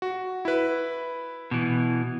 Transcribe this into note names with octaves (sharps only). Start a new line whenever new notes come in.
F#4
E4 B4
B2 E3